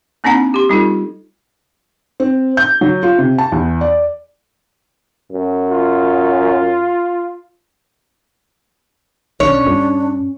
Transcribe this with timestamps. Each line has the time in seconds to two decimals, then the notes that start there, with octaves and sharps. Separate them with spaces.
0.24 A#3 C4 D4 D#4 F#5 A#5
0.54 G4 C6
0.69 G3 D#4 F4 A4
2.20 C4
2.57 G6
2.81 F#3
3.03 F4
3.18 C3
3.38 A5
3.52 E2
3.81 D5
5.32 F#2
5.71 F4
9.40 B1 C#4 D4 C#5
9.67 G2